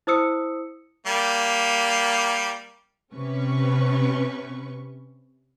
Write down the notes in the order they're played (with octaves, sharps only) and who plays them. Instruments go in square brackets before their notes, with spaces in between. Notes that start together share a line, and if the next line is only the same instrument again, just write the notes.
[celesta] E4 C5 D#6 E6 C#7
[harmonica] G3 A#3
[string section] C3 C#4 B4 C#6